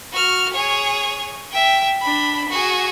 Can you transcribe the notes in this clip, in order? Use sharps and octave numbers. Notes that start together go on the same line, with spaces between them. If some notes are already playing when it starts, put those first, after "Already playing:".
F#4 F6
G#4 C#5
E5 G5
D4 B5
F#4 G#4